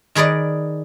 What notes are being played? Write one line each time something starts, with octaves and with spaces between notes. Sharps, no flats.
D#3 G#4 B4 D5 D#5